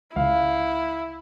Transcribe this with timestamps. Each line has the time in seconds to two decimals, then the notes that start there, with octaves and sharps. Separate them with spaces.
0.16 C#2 C#3 E4 F5